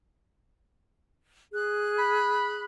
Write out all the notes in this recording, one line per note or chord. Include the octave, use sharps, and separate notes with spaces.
G#4 F#6
B5